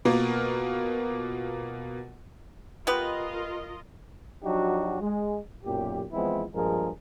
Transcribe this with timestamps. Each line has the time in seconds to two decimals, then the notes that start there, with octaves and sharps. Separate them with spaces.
0.05 B2 A#3 F4 A#4
2.87 B3 F4 G4 A#4 B4 D#5
4.43 F3 F#3 D4 D#4 F#4 G4
5.00 G#3
5.64 B1 F#2 A#2 G4
6.12 E3 F3 G#3 B3 C4 E4
6.53 A#1 G2 F3 G#3 G#4 A#4